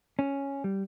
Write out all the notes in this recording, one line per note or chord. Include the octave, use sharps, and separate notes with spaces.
C#4
G3